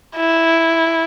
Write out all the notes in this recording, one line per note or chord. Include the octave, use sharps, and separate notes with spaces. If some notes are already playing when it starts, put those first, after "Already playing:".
E4